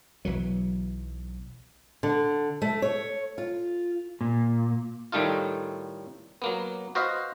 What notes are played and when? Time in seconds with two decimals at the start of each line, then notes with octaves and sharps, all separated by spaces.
0.25 B1 E3 F#3
2.03 D3
2.62 A3
2.82 C#5
3.38 F4
4.21 A#2
5.12 A2 D#3 G3 A3 D#4 F4
6.42 F#3 A#3 B3
6.95 F#4 B4 C5 D#5 F5